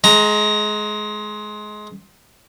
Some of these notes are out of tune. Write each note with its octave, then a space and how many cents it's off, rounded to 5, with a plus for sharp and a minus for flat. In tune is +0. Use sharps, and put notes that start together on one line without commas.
G#3 +25 A#5 +0